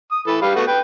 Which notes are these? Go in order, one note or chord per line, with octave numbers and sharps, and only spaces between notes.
D#6
E3 A4 B4
G3 B4 F5
A3 B3 F#4
B4 G5